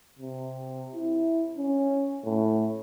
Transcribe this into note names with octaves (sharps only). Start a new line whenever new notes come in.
C3
E4
C#4
A2